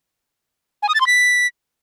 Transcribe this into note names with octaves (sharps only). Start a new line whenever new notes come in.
G#5
D#6
A6
C6
B6